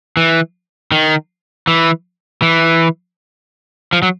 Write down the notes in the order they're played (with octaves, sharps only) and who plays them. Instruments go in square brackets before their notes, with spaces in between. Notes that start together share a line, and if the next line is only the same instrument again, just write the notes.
[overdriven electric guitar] E3
D#3
E3
E3
F3
F#3